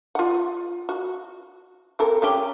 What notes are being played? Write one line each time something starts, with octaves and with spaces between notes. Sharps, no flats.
F4 F#5
F#4
C4 A4 A#4
G3 C#4 G4